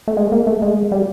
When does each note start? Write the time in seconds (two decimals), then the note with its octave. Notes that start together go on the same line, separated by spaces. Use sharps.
0.08 A3
0.17 G#3
0.32 A#3
0.47 A3
0.62 G#3
0.92 G3